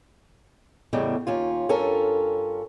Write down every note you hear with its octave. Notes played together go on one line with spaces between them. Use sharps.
E2 A2 C#3 G3 G#3
D#2 C#4 F4
G2 C#4 F4 A4 A#4